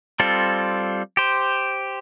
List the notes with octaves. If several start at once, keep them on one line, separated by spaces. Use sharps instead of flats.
G3 C4 F4 A4
G4 C5